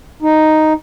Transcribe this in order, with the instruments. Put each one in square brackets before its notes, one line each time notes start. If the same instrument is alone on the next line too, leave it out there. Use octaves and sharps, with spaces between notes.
[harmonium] D#4